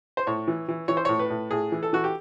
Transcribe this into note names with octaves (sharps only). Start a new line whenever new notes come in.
C5
A2 C#5
E3
E3
E3 C#5
C5
A2 C#5
B4
A2
A2 G#4
E3
A4
E3 F#4
G4